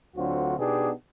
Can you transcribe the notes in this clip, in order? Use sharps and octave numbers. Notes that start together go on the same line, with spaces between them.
D2 D3 F#3 C4 F4 F#4
B2 B3 D4 D#4 G4 G#4